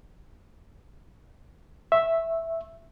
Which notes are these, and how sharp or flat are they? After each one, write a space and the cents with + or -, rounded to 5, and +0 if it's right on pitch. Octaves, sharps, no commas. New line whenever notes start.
E5 +0 C#6 -30